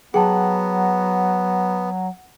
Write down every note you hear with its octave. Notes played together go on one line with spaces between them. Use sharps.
F#3 B3 G#4 F#5 G5 A5